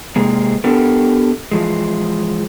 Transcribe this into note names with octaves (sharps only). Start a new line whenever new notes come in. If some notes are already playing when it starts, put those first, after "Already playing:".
C3 G#3 A#3
B3 D4 G4 A4 A#4
E3 F3 G#3